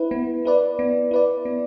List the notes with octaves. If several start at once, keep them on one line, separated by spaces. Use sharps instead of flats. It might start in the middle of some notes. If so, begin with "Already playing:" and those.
Already playing: E4 B4
B3
E4 B4 D5
B3
E4 B4 D5
B3